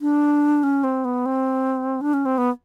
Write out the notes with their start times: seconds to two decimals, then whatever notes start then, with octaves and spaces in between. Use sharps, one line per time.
0.01 D4
0.63 C#4
0.84 C4
1.05 B3
1.26 C4
2.01 D4
2.14 C#4
2.26 C4
2.38 B3